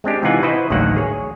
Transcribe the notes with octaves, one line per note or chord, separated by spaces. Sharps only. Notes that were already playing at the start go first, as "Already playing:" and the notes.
G#3 C4 D4 G4
C3 E3 D#4 F4 F#5 G#5
E4 F#4 B4 C5 D#5
A1 D2 D#3 F#3 A#3 F#5
G#4 C#5